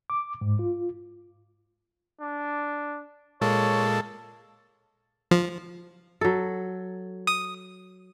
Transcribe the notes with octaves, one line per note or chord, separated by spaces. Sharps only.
D6
G#2
F4
D4
A#2 G#3 A#3 A4 C#5
F3
F#3 A4
D#6